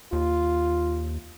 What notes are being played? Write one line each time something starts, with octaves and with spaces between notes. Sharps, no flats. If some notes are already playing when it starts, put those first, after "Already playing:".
D#2 F4